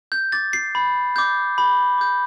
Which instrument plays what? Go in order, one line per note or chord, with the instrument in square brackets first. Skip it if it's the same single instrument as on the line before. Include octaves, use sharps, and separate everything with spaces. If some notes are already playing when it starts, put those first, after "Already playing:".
[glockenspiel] G6
D6 G6 A6
C7
B5
D6 G6
B5
D6 G6